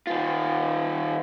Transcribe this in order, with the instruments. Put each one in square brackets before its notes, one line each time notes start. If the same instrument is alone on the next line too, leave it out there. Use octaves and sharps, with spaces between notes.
[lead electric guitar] D#3 F4